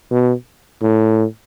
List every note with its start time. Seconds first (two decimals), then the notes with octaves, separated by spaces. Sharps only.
0.11 B2
0.82 A2